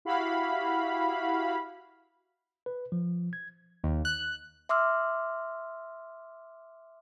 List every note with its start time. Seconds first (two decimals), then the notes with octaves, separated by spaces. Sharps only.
0.05 E4 F#4 G4 F5 B5
2.66 B4
2.92 F3
3.33 G#6
3.84 D#2
4.05 F#6
4.69 E5 C6 D6 E6 F6